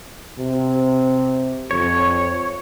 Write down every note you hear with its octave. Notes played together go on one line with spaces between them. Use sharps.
C3
F2 C#5